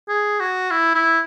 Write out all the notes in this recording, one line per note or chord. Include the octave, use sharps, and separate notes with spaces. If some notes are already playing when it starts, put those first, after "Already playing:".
G#4
F#4
E4
E4